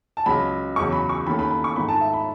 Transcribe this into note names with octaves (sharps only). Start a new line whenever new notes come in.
A5
C#2 C#3 F#3 B5
E2 C#3 F#3 C#6
B5
C#6
D#2 D#3 A3 C#4 B5
B5
B5
C#6
G#2 D#3 A3 B5
A5
E5
B5